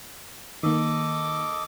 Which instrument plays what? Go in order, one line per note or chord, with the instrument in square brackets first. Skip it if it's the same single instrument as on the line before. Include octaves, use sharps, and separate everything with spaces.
[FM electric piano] D#3 A#3 [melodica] A4 D#5 D6